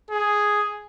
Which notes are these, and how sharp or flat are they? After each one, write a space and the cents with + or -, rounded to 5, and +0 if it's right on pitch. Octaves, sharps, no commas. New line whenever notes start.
G#4 +0